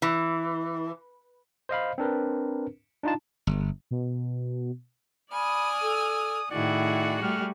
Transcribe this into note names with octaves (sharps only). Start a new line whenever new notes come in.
E3
C5 D#5 F5 B5
C4 D4 A#4 B4
D4 D#4 F4 A5
G1
B2
D5 G#5 B5 D#6 F6
A4
A2 D#3 E4 F#4 G#4 D5 F#5
G3 A3 F6